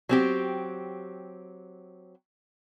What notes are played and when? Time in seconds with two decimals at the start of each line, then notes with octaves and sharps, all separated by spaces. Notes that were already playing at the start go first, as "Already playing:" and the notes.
0.09 F#3 C4 G4